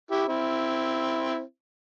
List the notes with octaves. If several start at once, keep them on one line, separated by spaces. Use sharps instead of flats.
E4 G4
C4 E4